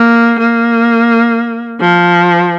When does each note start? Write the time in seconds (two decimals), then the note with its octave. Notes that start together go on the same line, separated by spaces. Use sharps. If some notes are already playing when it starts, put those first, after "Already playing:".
Already playing: A#3
0.39 A#3
1.81 F3